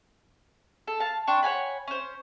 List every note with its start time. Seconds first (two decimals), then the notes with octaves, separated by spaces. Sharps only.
0.87 A4
1.00 F5 A5
1.27 D4 G5 C6 C#6
1.43 C#5 F#5 G#5 B5
1.87 C#4 C5